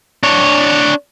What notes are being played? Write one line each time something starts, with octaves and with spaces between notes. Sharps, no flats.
D4 C#5